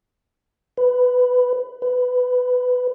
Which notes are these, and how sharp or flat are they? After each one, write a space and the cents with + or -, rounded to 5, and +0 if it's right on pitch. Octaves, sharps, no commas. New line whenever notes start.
B4 +10
B4 +15